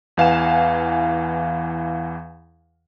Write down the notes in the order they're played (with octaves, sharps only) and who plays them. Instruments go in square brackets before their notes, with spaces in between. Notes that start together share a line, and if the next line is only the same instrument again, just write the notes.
[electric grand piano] E2 E3 F5 F#5 G#5 E7